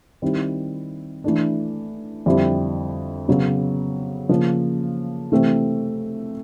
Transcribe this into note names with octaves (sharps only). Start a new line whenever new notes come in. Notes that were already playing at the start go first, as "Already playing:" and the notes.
D#3 G3 C4 E4
E3 A3 D4
F2 D3 G3 C4 E4
C#3 F#3 B3
C#3 F3 A#3
C3 E3 A3 C4